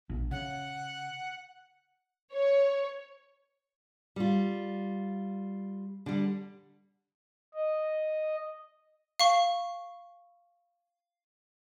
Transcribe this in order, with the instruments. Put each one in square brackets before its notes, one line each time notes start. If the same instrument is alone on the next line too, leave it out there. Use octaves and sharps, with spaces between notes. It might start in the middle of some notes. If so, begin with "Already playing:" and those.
[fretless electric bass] A#1
[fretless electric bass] C#3 [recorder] F#5
[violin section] C#5
[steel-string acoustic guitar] G3 F4
D3 G3
[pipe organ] D#5
[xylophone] F5 C#6